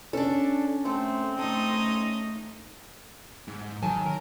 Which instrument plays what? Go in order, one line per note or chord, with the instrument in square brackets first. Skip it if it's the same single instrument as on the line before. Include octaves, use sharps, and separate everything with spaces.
[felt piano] C#4 [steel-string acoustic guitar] D4 A4
[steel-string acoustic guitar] A3 A4 [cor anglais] C4
[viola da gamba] A3 D#4 D#5 [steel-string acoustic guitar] A4
[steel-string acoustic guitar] C#4
[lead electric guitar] G#2
[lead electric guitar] D#3 [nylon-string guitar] F#3 G#5 A5
[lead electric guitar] A#4